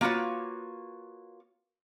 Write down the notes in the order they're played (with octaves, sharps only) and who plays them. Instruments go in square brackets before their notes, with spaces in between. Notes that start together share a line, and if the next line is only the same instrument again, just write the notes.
[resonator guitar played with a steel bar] A#3 F4 F#4 B4 C#5